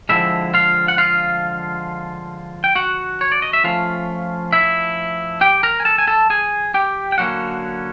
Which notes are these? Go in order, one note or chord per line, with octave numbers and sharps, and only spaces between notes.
D3 F3 G#3 C4 E4 E5
F4 F5
F#5
F4 F5
G5
F#4 F#5
C#5
D5
D#5
E5
F3 A3 C#4 F4 F5
E4 E5
G4 G5
A#4 A#5
G#5
A4 A5
G#5
A4 A5
G#4 G#5
G4 G5
G5
D3 F#3 A#3 C#4 F#4 F#5